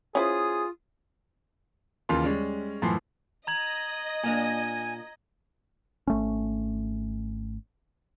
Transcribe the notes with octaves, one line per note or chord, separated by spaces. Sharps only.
C#4 E4 F4 G#4 C5 D#6
D#2 C#3 E3 F4 A#4 C6
G3 G#3 C#4
F#2 A2 E3 F3 C6
D#5 A#5 G#6 F#7
A#2 A#3 D4 G#5
G#1 A3 C#4